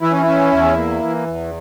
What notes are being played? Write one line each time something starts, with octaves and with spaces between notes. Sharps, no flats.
E3 E4
C#4
C#4 E4
E2
A#3
E3
E2